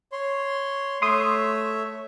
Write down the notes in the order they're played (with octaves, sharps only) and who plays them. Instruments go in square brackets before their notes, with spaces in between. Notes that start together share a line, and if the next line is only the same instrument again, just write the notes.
[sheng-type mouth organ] C#5 C6
[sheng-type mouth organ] A3 C#5 E5 [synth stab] C6 D#6